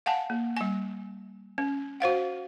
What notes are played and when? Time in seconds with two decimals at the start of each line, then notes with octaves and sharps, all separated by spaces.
0.06 F5 F#5 G#5 A5
0.30 A#3
0.57 G3 G#5
1.58 C#4
2.00 F#4 C5 F5 F#5